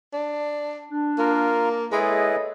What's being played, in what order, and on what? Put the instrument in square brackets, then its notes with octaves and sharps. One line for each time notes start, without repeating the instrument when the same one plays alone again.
[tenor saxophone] D4
[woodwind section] D4
[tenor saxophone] A#3 [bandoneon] F4 A#4
[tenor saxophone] G#3 [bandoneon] E4 G#4 B4 [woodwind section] A4 C#5 D#5